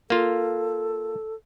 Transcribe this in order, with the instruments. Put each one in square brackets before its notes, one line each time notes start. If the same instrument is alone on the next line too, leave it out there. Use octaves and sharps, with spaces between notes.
[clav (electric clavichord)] A#3 F4 [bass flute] A4